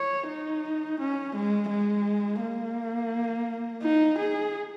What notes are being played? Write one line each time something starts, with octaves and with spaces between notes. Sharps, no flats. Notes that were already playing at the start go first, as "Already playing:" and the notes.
Already playing: C#5
D#4
C#4
G#3
G#3
A#3
D#4
G#4